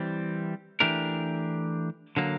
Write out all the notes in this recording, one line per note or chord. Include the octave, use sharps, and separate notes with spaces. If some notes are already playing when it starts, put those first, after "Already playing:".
Already playing: E3 G3 C4
E3 A3 D4 G4 A#4
D3 F#3 A#3